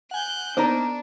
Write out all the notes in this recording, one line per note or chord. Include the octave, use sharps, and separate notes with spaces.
F#5 G#5 F#6 G6
A#3 B3 D4 D#4 A#4 C5 D5 A#5